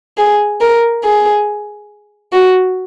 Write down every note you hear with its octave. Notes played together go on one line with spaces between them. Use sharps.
G#4
A#4
G#4
F#4